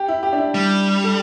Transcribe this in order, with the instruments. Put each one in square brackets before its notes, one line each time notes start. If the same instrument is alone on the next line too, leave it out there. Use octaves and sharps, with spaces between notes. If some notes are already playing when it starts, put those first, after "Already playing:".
Already playing: [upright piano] G4
E4
G4
D4
E4
[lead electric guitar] G3
[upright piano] A4